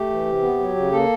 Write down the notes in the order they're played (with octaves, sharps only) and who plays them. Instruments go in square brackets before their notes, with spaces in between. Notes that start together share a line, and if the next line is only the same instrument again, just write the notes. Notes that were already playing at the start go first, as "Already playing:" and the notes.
Already playing: [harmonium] A3 G4
E3
C3
B3
F#3
C#3
A#3 A4